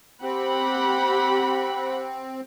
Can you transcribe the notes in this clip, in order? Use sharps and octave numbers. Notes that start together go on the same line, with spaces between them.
C4 G4 F#5 B5